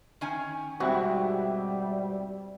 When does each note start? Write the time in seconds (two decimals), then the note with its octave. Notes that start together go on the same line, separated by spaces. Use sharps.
0.21 D#3 C#4 G#5
0.80 G#2 B2 G3 G#3 C4 F#4 E5 G5